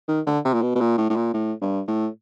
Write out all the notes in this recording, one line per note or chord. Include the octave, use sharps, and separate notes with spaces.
D#3
D3
C3
A#2
B2
B2
A#2
A2
A2
A#2
A2
G2
A2